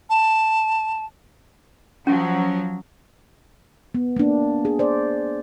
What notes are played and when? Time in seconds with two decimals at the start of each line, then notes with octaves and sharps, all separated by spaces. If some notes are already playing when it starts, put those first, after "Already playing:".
0.10 A5
2.07 F3 F#3 C#4
3.95 B3
4.16 A#3 D4
4.65 G#4
4.79 C5 D5